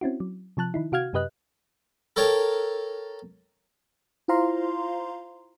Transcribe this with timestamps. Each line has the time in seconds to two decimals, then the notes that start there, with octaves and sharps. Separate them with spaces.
0.01 C4 C#4 E4 F#4
0.20 F#3
0.57 C3 F3 A5 F#6
0.74 D#3 D#4 E4
0.92 C3 F#4 F5 F6 G#6
1.13 F#2 C3 G4 B4 D#5 F#6
2.16 A4 A#4 C#5 G5 A5
4.28 E4 F4 C5 F5 A#5 C6